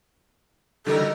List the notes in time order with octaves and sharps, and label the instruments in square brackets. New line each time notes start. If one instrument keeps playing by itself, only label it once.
[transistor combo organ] D3 E3 G3 [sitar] F#3 D#4 A#4 [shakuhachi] A4